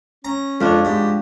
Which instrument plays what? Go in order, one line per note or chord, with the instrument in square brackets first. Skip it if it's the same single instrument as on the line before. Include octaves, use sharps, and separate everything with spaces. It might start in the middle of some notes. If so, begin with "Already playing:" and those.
[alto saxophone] C#4 [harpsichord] A#5
[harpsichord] F2 [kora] F3 D4 C#5 [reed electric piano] G#3
[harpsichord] G#2 [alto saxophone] G4